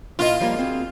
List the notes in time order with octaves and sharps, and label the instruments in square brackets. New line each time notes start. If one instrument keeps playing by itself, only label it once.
[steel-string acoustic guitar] A#2 E4 D#5 [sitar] F4
[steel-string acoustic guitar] F3 G3 A#3
D2 C4 G#4